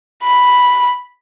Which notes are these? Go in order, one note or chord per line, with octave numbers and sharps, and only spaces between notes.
B5